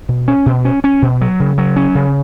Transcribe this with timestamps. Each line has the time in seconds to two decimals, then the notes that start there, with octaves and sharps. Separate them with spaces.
0.09 B2
0.28 C#4
0.46 B2
0.65 C#4
0.84 C#4
1.02 B2
1.21 F#3
1.40 C#3
1.58 F#3
1.76 C#4
1.95 C#3